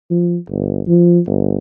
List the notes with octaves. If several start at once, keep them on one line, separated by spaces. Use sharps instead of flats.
F3
G1
F3
G1